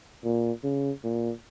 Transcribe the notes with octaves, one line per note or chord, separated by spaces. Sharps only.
A#2
C#3
A#2